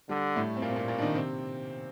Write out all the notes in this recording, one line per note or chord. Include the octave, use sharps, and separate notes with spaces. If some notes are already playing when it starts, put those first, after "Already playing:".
D3 G3
A2 A3
C4
A#2 A#3
C4
A#2 A#3
A#2 A#3
D4
D#3 D#4
C3 C4